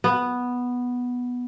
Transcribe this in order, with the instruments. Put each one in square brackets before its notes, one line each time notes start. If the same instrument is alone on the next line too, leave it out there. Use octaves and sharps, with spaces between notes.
[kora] B3